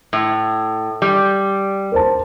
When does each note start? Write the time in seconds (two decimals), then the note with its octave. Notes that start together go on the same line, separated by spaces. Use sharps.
0.13 A2
1.02 G3
1.92 A#4 C5 A5